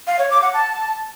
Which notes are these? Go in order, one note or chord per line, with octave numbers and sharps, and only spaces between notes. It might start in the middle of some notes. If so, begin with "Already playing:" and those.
F5
C#5
D6
F#5
A5